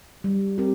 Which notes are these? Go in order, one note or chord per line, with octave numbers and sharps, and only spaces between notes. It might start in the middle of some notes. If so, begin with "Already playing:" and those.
G3
C4 G4 A#4